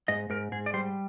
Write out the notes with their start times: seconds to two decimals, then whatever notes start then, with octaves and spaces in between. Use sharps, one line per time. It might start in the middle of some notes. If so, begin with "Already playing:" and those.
0.08 G#2 D#5
0.30 G#2 A#4
0.52 G#2 G#4
0.66 D5
0.74 G3 C5